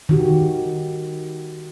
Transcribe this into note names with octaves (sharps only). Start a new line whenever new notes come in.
D#3 F#4 G4